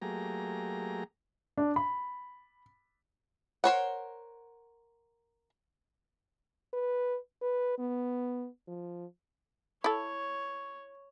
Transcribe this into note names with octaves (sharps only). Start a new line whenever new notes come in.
F#3 A3 A#3 G4 G#4 A#5
D4
B5
A#4 C5 C#5 F#5
B4
B4
B3
F3
E4 A4 C#5